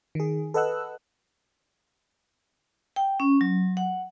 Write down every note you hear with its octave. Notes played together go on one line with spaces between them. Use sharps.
D#3 G#4
A4 B4 D#5 F#5 E6 F#6
G5
C#4
F#3
F#5